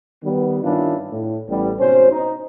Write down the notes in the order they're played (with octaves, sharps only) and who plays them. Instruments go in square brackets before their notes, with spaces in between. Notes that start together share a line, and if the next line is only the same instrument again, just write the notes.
[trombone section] D#3 G3 B3
G2 D#3 C#4 D4 E4 F4
A2
A1 G3 B3
G#1 B2 C#4 C5
D#4